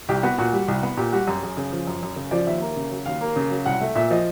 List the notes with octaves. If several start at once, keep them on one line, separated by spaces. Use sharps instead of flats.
C2 G4
B3 F#4
A#2 F#4
G3
C2
B3
A#2 G4
G3 F#4
F#2 G4
F#2 G#4
C#3 G#4
F3
F#2
F#2
C#3
F3 D5
D#2 E5
A#3
C#3
F#3
D#2 F5
A#3
C#3
F#3
C2 F#5
A3
A#2 E5
F3 D#5